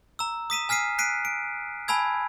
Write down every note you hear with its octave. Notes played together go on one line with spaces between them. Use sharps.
A#5 E6
D#6 B6 D#7 E7
G#5 F6 B6 C7 D#7
F#6 B6 C7 D7 D#7
D7
G#5 A5 B5 E6 G#6